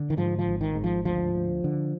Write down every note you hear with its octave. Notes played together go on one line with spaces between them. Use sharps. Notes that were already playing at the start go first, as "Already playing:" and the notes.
Already playing: D3
D#3
G#2 F3
F3
G#1
D#3
G#2
F3
D2 F3
D2
D3